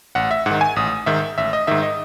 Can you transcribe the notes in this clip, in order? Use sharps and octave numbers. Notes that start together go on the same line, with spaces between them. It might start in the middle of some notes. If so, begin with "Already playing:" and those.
A1 F#5
E5
G#2 D#3 F#5
G#5
A1 D#6
G#2 D#3 E5
A1 E5
D#5
G#2 D#3 E5
D#5